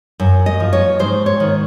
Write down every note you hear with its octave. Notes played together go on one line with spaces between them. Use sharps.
F#2
D#5
F3
C#5
G#2 C5
C#5
D#3